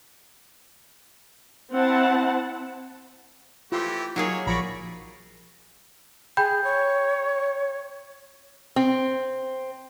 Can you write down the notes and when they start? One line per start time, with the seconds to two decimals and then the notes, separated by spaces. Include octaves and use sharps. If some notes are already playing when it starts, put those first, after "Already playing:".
1.74 C4 E4 F#5 A5
3.72 E3 A3 F4 G4 C6 E6
4.16 F#3 A#3 D#4 G#4 C#5
4.47 A#1 F3 D5 A#5 B5 C#6
6.37 G#4 G5 B5 G6
6.64 C#5
8.76 C4